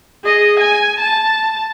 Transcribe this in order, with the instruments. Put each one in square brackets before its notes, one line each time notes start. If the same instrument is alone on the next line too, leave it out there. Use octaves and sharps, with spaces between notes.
[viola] G#4 D#5
G#5
A5